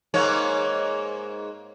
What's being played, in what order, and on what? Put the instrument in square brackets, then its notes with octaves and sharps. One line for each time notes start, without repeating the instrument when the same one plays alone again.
[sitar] G#2 A#3 C#5